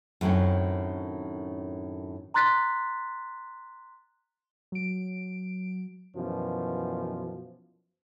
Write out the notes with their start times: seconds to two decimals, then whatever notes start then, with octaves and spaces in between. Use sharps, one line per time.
0.21 F#2 A2 D#3 C4 C#4
2.34 A#5 C6 F#6 A6 B6
4.72 F#3 D7
6.16 F#2 B2 E3 F3